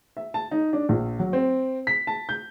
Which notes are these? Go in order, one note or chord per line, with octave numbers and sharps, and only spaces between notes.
E5
A5
D#4
D4
A#1
F#3
C4
B6
A5
G6